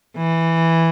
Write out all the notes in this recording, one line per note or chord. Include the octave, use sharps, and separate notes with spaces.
E3